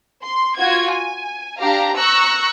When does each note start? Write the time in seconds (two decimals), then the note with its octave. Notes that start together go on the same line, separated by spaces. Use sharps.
0.21 C6
0.57 F4 F#4 G#6
0.90 G#5
1.59 D4 G4 F5 A#5
1.97 A#5 C#6 E6 F#6